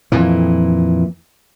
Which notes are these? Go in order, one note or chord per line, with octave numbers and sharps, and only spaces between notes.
F2 A#2 E3